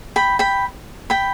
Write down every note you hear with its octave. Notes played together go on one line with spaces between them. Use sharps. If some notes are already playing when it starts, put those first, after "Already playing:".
G5 B5
G5 B5
G5 B5